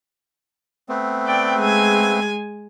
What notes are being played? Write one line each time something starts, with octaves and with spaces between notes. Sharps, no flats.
A3 B3 C4
D5 G5
G#3 G#5